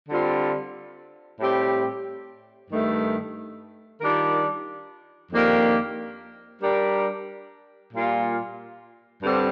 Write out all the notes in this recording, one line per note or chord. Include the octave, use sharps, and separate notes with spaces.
D3 G3 C4 F4
A2 G3 C4 G4
G2 D#3 A3
D#3 G3 D4 F4 A#4
F2 D#3 A#3 D4 G4
G3 D4 G4 A#4
A#2 G3 A#3 F4
G2 D3 G3 C4